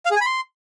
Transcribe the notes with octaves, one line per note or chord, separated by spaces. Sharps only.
F5
G#4
G#5
B5
C6